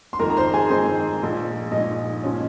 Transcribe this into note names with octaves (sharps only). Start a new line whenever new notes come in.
C6
F2 D#3 G#3 A#4 A#5
A#5
C5 C6
G#4 G#5
F2 D#3 G#3 C4 C5
A#1 A#2 G#3
A#1 A#2 G#3 D#4 D#5
A#2 F3 G#3 C#4